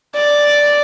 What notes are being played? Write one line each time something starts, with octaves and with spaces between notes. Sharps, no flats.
D5